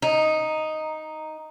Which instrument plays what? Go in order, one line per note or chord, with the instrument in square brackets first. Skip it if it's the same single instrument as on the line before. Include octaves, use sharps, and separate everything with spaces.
[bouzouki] D#4